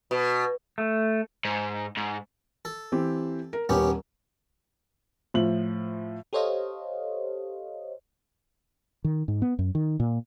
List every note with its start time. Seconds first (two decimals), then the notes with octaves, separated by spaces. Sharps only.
0.11 B2
0.78 A3
1.45 G#2
1.97 G#2
2.65 A4
2.92 E3 C4 G4
3.53 A#4
3.69 D#1 D#2 B3 C#4 G4
5.34 A2 F3 F#7
6.33 G4 A4 C5 C#5 D#5 F5
9.04 D#3
9.28 G#2
9.42 B3
9.59 F#2
9.75 D#3
10.00 A#2